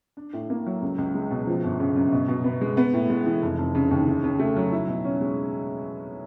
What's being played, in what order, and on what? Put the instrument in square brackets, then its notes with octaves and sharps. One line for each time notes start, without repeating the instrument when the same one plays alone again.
[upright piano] D4
A2
A#3
F#3
C#2
C#2
G#3
B2
F3
G1
C#3
F#2
B2
B2
B3
G#3
B3
A2
G#3
E3
F1
F1
C#3
D#2
C#3
C#3
A3
F#3
E4
B2
C#4
G#3